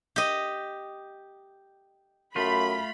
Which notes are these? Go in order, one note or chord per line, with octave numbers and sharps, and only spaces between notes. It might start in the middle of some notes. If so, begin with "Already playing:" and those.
G4 D#5
F#2 A3 F4 B5